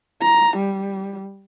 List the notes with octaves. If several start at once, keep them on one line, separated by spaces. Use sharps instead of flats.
A#5
G3